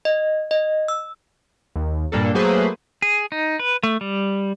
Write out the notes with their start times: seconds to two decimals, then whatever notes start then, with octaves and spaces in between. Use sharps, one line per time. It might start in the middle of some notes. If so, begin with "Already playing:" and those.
0.05 D#5
0.51 D#5
0.88 E6
1.75 D#2
2.12 G2 A#2 G3 A#3 D4 A4
2.34 F#3 A3 A#3 G#4 B4 C5
3.02 G#4
3.32 D#4
3.59 B4
3.83 A3
4.01 G3